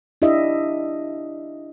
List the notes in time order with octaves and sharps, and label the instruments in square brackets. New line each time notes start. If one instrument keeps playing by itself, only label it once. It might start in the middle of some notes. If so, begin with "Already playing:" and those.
[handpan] D4 E4 G4 D#5 E5